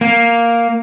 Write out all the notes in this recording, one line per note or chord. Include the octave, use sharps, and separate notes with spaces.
A#3